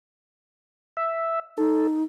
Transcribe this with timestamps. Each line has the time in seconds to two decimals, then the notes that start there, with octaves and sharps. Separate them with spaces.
0.97 E5
1.58 D#4 A4